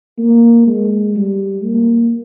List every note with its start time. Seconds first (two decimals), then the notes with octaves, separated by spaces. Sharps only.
0.18 A#3
0.67 G#3
1.15 G3
1.64 A#3